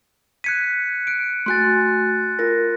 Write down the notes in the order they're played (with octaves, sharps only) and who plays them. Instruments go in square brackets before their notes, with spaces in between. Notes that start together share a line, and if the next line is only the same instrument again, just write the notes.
[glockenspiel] F#6 C#7 D#7 [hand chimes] G#6 B6
[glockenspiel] F#6 D7
[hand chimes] A3 F#4 G#5 [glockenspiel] C6 F#6 A6
[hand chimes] F4 A#4 [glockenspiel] A#6